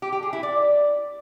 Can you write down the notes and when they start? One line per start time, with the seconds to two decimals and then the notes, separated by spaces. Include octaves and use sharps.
0.02 G4
0.12 G4
0.23 G#4
0.33 E4
0.43 D5